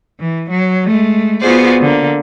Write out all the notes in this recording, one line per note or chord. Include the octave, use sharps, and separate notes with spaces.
E3
F#3
G#3 A3
B3 F4 F#4 G#4 C5 D5
D3 A#3